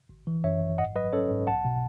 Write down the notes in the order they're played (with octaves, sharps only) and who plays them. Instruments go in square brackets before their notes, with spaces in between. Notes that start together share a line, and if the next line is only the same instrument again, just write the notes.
[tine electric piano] G#1
E3
F#2 C#5 E5
G#1
G#2 D#5 F#5
F#3 B4 D#5
C#4 A4 C#5
G#2
B1 F#5 A5
B2